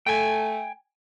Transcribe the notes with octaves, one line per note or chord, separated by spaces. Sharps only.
A3 G5 G#5